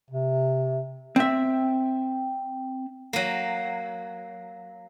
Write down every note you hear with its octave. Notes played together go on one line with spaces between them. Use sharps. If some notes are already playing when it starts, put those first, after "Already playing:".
C3
C4 E5
F#3 A#3